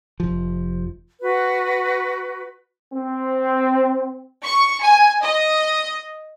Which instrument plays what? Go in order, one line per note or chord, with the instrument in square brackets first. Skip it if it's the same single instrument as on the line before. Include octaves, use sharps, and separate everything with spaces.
[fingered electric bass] F1 F3
[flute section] F#4 B4
[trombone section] C4
[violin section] C#6
G#5
D#5